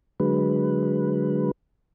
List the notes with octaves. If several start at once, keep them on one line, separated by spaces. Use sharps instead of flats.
D3 F#3 G#3 B4